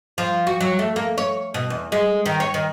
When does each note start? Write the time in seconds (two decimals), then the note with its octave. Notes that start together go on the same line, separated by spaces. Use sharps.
0.18 F3
0.47 F#4
0.61 F#3
0.79 A3
0.96 A#3
1.18 C#5
1.54 B2
1.70 E2
1.92 G#3
2.26 D#3
2.40 C#5
2.54 D#3